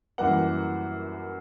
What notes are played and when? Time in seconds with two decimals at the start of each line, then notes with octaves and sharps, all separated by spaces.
0.18 F#2 E3 G3 A#3 F#5